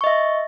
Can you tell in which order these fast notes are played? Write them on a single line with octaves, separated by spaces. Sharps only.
C#6 D#5 E5